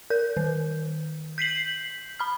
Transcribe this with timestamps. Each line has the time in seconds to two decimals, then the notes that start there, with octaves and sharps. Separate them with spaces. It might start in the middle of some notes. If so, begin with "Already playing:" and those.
0.10 A#4 G6
0.37 D#3
1.38 G6 B6 C7 F#7
2.20 B5 F6